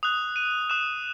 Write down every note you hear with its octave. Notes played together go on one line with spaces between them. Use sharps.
D#6 F#6 F7
D#7
D#6 F#6 E7